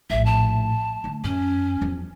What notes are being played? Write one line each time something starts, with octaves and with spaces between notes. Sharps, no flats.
A#1 A2 E5
A5
D3 A3
F#2 C#4
E2 F3